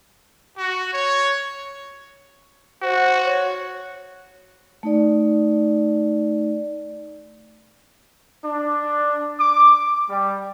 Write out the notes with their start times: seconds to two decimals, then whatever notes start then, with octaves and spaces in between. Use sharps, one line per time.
0.57 F#4
0.93 C#5
2.82 F#4 C5
3.25 C#5
4.83 A3 D#4 D5
8.45 D4
9.40 D6
10.10 G3